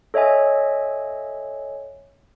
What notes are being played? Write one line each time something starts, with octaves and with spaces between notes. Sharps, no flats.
A4 C#5 D#5 E5 G#5